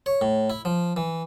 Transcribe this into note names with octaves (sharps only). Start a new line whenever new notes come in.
C#5
A2
E4
F3
E3